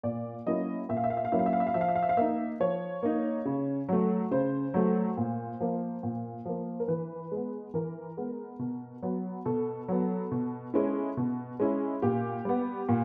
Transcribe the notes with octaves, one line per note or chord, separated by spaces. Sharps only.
A#2 D5
F#3 A#3 C#4 E4 D#5
A#2 E5
F5
E5
F5
E5
F5
F#3 A#3 C#4 E4 E5
F5
E5
F5
E5
F5
F3 E5
F5
E5
F5
E5
F5
A#3 D#4 E5
F3 C#5
A#3 D#4
C#3
F#3 A3
C#3 C5
F#3 A3
A#2
F3 A#3
A#2
F3 A#3
A#4
E3 B4
G#3 B3
E3 A#4
G#3 B3
B2
F#3 B3
B2 A4
F#3 B3
B2
G#3 C#4 E4
B2
G#3 C#4 E4
A#2 G4
G3 B3
A#2